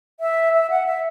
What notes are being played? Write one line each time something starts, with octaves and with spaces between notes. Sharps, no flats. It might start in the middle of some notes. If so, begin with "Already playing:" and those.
E5
E5
F#5
E5